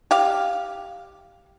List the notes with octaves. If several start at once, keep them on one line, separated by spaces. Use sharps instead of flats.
G4 F5